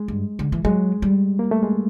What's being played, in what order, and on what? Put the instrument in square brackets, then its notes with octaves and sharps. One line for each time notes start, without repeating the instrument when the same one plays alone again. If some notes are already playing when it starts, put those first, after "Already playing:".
Already playing: [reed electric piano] G#3
[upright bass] G2
D3
E3
[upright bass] F#3 [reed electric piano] G#3
[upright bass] G3
[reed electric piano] A#3
A3
G#3